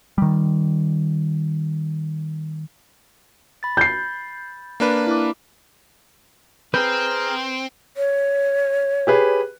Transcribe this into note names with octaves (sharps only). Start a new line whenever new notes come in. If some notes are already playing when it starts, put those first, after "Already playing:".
D#3 G3
B5 A6
G6 C7
A#3 D4 B4
E4 D6
C4 G#4 B4 A#5 F6 G6
C#5
G4 G#4 B4